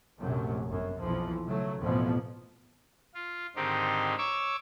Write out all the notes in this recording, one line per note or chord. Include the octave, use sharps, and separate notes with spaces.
A#1 F#2 C3 F#3 A3
G1 F#2
B1 F2 E3 F3
C#3 F#3 A3
A1 F2 B2 E3 F3 B3
F4
G#2 D3 D#3 C4 D#4 G4
C#5 C#6 D6 E6